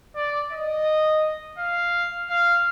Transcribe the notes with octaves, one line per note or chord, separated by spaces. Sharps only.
D5
D#5
F5
F5